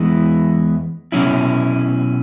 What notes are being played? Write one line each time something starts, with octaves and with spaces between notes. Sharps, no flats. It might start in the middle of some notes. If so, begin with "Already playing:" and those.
Already playing: E2 E3 G#3 B3 E4
B2 F#3 C#4 E4